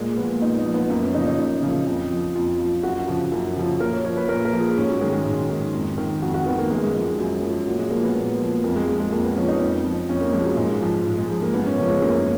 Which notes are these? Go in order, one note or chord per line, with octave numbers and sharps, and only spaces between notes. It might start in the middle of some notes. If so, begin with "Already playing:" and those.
Already playing: A#2 G#3
F3 B3
A#2 D#4
D#4
F3
B3
F#2 A#3
C#4
C#3 F3 D#4
D#4
F#2
C#3 F3
F2
F3
F2 F4
F3
F#2 F#4
C#3 F3
F#2
C#3 F3
A#2 A#4
C#5
F3 C#5
B4
A#2 A#4
A#4
F3
G#4
G#2 C#4
F#3
D#3 G#3
G#3
G#2
D#3
F2
D#3
F2 F#4
F#4
D#3 B3
A#3
F#2 G#3
G#3
F3 G#3
F#2 F#3
F3
A#2 F#3
G#3
F3 A#3
B3
A#2
F3
F2 A#3
G#3
F3
G#3
F2 A#3
B3
F3 C#4
D#4
F2
F3
F2 C#4
A#3
F3 G#3
F#3
G#2 G#3
F3
G#2 G#3
G#3
F3
A#3
F#2 B3
C#4
C#3 F3 C#4
G#3
F#2 A#3